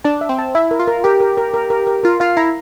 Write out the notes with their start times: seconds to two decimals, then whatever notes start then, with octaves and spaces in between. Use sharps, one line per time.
0.05 D4 A5
0.21 E5
0.29 C4
0.38 A5
0.55 E4 E5
0.71 A#4
0.80 F4
0.87 A#4
1.04 G4 A#4
1.20 A#4
1.37 A#4
1.54 A#4
1.70 A#4
1.87 A#4
2.03 F4 A#4
2.20 F4 F5
2.37 E4 A#5